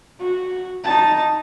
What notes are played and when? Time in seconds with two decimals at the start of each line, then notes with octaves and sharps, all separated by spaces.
0.19 F#4
0.84 D#4 A5